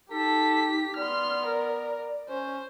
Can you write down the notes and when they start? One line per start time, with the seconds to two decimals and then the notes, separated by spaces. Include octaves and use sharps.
0.11 D#4 G4 A4 B6
0.97 B3 D5 C6 F6
1.46 A#4
2.30 C#4 C5